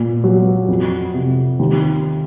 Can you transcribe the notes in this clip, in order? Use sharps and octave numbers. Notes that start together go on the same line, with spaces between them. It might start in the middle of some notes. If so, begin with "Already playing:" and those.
Already playing: A#2
F#3
F2
C3
D#2